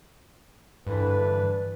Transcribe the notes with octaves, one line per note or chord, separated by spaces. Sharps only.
E2 G2 D3 E3 D4 B4